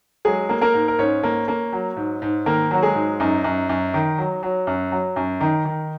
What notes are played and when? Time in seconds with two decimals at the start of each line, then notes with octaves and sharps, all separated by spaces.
0.25 F#3 G#3 G#4
0.49 A#3
0.61 A#3 A#4
0.74 G#2
0.88 A#4
0.99 G#2 C#4 C#5
1.23 A#3
1.48 A#3
1.72 F#3
1.96 G#2
2.22 G#2
2.46 D#3 A#3 A#4
2.71 F#3 F#4
2.83 G#3 G#4
2.95 G#2
3.20 F#2 D#4
3.44 F#2
3.69 F#2
3.94 D#3
4.18 F#3
4.43 F#3
4.67 F#2
4.92 F#3
5.16 F#2
5.41 D#3 D#4
5.65 D#3